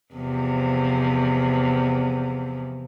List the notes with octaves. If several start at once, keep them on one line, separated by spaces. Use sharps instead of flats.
E2 C3 F3